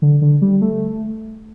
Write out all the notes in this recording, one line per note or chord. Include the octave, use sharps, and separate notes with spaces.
D3
D3
G3
A3